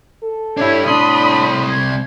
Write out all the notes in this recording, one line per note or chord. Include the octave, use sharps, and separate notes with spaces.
A4
D4 E4 G4 C#5
C2 A2 D4 B5 C6 D#6
G#6